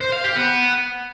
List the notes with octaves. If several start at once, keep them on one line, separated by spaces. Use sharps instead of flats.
C5
F5
G4
B3